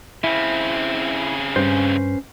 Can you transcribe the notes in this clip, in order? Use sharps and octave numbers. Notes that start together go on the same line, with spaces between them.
C#3 C4 E4
G2 C#4 B4 C5